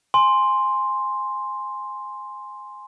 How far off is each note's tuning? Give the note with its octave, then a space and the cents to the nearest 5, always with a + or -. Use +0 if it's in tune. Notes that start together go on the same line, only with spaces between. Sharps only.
G#5 +0 C6 +0